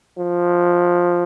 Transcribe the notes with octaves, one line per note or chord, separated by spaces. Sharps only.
F3